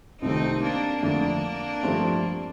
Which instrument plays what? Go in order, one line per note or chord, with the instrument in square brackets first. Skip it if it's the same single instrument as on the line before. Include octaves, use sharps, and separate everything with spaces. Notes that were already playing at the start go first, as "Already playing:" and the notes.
[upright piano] C2 C3 D#3 A3 [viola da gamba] C4 D#4
[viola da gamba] A#3 D4
[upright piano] F2 D3 A3 [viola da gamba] A#3 D4
[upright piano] G2 F3 A3 C4